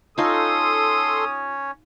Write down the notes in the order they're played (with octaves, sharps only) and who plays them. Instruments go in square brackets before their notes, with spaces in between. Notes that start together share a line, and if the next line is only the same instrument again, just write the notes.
[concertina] C#4 C#5 [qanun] D#4 F4 [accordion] A4 C6 [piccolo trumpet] D#6